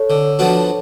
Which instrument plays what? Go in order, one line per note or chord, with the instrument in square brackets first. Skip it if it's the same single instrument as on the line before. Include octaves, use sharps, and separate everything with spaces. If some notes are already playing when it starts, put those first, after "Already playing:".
Already playing: [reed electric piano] A4 C#5
[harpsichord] D3
F3 B3 D4 F#4